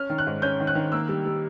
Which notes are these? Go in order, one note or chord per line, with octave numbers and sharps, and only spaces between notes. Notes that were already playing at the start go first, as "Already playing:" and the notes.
Already playing: C#4 F6
D#3
F#6
G#2
C#4 G6
D#3
F#6
D#3
A#3 E6
G3
G3